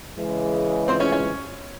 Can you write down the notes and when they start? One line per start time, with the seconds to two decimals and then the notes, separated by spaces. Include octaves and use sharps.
0.17 C#3 E3 G#3
0.88 C4 C5
1.00 C#4 C#5
1.12 C#4 C#5